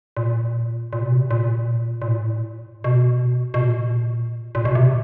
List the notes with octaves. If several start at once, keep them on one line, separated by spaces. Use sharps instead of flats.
A#2
A#2
B2
C3
A#2
A#2
A2
B2
B2
A#2
A#2
B2
C3